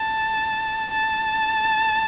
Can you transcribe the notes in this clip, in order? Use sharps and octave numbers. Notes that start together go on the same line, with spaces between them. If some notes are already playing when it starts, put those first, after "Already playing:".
Already playing: A5
A5